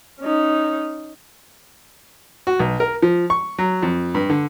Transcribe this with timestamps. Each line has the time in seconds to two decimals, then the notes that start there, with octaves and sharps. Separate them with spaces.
0.20 C#4 D#4
2.47 F#4
2.59 B1
2.80 A#4
3.02 F3
3.30 C#6
3.59 F#3
3.83 F2
4.15 G2
4.30 D3